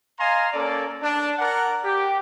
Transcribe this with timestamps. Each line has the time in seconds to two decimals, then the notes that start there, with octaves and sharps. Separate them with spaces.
0.20 D#5 F5 G#5 A#5 C6
0.52 A#3 C#4 A4 D5
1.02 D4
1.38 A#4 D5 F#5
1.84 G4